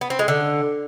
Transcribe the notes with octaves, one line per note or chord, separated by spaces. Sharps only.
B3
C4
G#3
D3